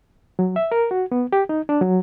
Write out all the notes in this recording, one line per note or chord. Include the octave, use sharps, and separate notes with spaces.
F#3
E5
A#4
F#4
B3
G4
D#4
D4
F#3